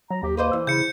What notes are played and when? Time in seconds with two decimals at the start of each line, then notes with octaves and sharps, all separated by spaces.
0.11 F#3 A#5
0.23 D#2 G4
0.37 A#3 B4 C5 D#5
0.53 E3
0.67 C#3 E4 G6 C#7